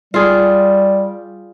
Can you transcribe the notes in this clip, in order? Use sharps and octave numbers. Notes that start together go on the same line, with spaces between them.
G3 F4 G#4